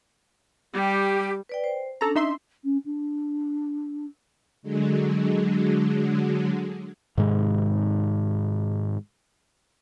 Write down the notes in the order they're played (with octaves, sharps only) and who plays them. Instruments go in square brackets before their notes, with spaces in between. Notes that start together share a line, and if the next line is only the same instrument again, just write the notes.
[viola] G3 [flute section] G4
[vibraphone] B4 D5 G5
C5
[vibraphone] C#4 D4 [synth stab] A4 A#5
[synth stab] D#4 E5 C6
[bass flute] C#4
D4
[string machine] D3 F#3 G#3
[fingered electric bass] G#2 C3 D#3 G#3